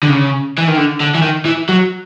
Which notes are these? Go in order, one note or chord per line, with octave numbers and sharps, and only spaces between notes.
D3
C#3
E3
D#3
D3
D3
E3
D#3
E3
F#3